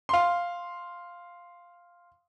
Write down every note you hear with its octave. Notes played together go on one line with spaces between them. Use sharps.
F5 C6